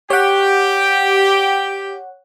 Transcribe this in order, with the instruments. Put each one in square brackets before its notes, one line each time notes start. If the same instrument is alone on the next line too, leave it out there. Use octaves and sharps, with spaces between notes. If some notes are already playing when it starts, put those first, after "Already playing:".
[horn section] G4 [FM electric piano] C#5 F#5